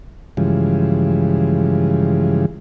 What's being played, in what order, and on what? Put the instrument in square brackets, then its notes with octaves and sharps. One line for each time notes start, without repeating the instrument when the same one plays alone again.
[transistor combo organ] G2 C#3 E3 F3 G#3